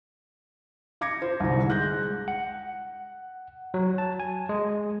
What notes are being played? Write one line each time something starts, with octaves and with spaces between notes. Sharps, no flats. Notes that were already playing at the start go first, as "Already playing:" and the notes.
F5 D6 G#6 A#6 C#7
F4 C5
C2 G#2 D3
G#3 F#6 G6 A#6
F#5
F#3
A5
G#5
G#3